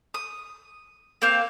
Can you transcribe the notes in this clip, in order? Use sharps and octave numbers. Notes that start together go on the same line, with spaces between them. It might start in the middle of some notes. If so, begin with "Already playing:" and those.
D#6
A#3 C4 F5